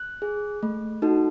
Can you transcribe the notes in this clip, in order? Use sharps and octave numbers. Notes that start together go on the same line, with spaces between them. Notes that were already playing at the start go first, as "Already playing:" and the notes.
Already playing: F#6
G#4
A3
D#4 F#4 A4